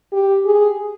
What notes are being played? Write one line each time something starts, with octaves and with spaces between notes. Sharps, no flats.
G4
G#4